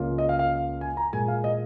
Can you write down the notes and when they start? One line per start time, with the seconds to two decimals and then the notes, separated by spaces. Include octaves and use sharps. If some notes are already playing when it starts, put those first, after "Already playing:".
Already playing: C#2 C#3 A#3 C#4 F4
0.18 D#5
0.29 F5
0.39 F5
0.81 G#5
0.97 A#5
1.12 A#2 G#3 F4 G#5
1.28 F5
1.44 D#5